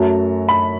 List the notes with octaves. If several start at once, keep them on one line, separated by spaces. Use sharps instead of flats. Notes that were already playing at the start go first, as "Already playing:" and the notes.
Already playing: F#2 F#3 A3 A5
B5